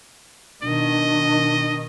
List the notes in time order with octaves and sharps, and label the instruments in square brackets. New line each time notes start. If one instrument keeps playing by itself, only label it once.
[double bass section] B2 D#3 [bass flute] D4 [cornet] D#5